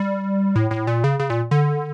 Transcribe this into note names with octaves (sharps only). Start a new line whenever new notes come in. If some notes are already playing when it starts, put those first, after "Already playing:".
Already playing: G3
A2
A2
A#2
C#3
C#3
A#2
D3